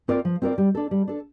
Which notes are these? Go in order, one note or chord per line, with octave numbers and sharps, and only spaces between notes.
C4 F4 A#4 D5
F3
C4 F4 A#4 D5
G3
D4 A4
G3
D4 A4